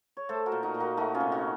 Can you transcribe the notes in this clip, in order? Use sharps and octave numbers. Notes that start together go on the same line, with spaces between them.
C#5
A3 A4 C5
F#4 A#4
A#2
D#4 F#4
A#2
F#4 A#4
A3 D#4 F#4
C#4 F4
C3
D#4 F#4